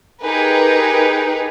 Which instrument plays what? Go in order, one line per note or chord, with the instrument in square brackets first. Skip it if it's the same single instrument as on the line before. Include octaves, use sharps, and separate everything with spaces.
[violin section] D#4 G4 G#4 A#4 B4